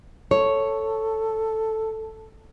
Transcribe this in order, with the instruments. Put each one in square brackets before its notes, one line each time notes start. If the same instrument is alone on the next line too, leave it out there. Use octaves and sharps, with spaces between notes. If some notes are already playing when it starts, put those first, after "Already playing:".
[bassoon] A4 [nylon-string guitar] C#5